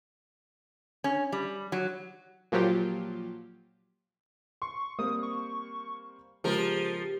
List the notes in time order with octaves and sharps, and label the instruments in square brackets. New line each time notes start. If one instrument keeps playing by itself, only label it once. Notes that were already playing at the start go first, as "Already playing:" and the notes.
[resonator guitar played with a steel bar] C#4
G3
F#3
[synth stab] A#2 F3 F#3 F4 G4
[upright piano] C6 [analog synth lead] C#6
[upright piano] G3 A#3 C4 [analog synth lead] D#6
[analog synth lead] C#6
[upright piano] C#3 G#3 B3 [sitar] F3 A#4 [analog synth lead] G4